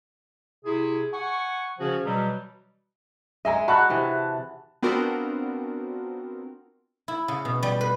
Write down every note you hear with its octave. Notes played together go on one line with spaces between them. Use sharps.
C3 E4 G#4
F#5 G#5 C#6
C#3 F3 C#4 F#4 G#4
B2 E3 F#3 G3
G#3 G#4 D#5 E5 A#5
F#4 A5 B5 F#6
C3 E3
B3 C4 D4 F4 F#4 A#4
E4
C#3
B2
G3
B4